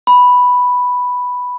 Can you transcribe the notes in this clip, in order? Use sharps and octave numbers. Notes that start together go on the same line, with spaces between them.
B5